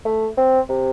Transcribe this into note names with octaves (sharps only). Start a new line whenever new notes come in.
A3
C4
C3